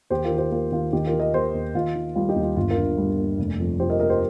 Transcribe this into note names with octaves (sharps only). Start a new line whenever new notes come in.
D#2 G4 C5
F4 A#4
D#3
G4 C5
A#3 F4 A#4
D#2 F4
D#2 D#4 G4
F4 A#4
D#3
A#4 D#5
A#3 G4 C5
D#2
D#2 F4
D#3
G3 F4
D#4 G4
D#2
F4
G1 F4
F4 A#4
G2
G3
A#3
F1
F2
F3 G4 C5
A#4 D#5
A#3 A#4 D#5
G4 C5